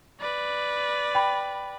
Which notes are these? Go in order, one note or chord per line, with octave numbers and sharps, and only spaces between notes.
B4 D5
G5 B5